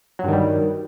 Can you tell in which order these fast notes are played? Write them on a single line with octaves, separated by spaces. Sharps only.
F#3 G2 D#3 G3